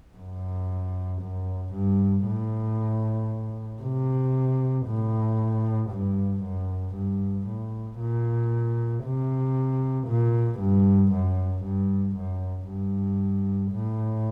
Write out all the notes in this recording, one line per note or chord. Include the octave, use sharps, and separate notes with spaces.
F#2
F#2
G2
A2
C3
A2
G2
F#2
G2
A2
A#2
C3
A#2
G2
F#2
G2
F#2
G2
A2